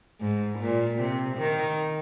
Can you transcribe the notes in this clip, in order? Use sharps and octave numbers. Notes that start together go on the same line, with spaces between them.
G#2
A#2
C3
D#3